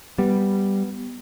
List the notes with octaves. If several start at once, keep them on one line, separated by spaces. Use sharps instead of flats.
G3 B3